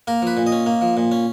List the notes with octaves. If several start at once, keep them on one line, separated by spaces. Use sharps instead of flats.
A#3 A#4
F3 B4
A#2
D#5
C#4
A#3
F3
A#2
C#4